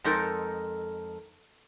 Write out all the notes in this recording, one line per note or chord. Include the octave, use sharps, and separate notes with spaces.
F2 G#3 D#4 A4 A#4